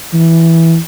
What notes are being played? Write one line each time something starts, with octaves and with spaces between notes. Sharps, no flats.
E3